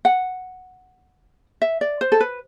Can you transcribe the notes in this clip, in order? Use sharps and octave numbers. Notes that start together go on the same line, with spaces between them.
F#5
E5
D5
C5
A4
B4